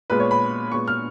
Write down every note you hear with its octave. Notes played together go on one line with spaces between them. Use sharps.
A#2 G#3 B3 B4
C#5
B5
A#2 G#3 B3 C#6
F6